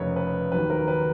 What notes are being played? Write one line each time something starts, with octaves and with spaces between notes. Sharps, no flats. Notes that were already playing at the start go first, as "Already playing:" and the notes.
Already playing: F1 F2 C#3 A#4 B4 C#5
B4
D#2 D#3 F#3 B4
A#4
B4